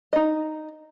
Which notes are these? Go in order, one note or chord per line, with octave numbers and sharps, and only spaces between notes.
D#4 D#5